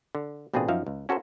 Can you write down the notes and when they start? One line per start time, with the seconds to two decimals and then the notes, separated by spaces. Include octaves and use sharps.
0.15 D3
0.53 A1 B2 C4 D4 F4 G#4
0.68 F#2 F3 D#4 E5 F5
0.87 C#2
1.09 C#4 F#4 A4 A#4 C5